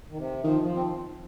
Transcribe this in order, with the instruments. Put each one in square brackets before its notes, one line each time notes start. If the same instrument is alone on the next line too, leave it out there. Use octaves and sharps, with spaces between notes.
[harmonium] D#3
C3
[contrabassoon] D#3 [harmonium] F3
[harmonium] F3
C4